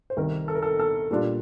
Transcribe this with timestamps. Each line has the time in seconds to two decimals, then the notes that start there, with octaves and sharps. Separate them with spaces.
0.10 C5
0.17 C2 C3 D#3 A#4
0.48 A4
0.55 A#4
0.62 A4
0.80 A4
1.11 A#2 G3 D4 F4